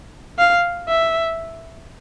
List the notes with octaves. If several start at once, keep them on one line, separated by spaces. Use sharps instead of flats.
F5
E5